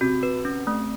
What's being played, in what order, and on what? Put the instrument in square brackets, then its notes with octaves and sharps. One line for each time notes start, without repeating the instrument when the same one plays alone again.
[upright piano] C3 [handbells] F#4
[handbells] B4
C#4
A3